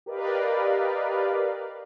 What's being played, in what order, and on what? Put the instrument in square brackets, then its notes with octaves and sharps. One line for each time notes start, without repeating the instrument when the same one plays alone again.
[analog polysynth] G4 A#4 B4 D5 D#5 F5